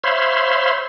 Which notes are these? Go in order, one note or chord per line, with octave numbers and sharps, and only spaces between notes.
C5 C#5 E5 F5 B5 C6